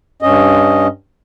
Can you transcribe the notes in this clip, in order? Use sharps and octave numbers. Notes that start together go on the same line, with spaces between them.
G2 C#4 D#5